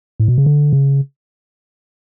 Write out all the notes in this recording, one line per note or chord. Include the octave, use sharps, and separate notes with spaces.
A2
B2
C#3
D3
C#3